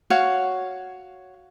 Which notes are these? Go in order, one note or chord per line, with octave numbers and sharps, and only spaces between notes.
F#4 C#5 F5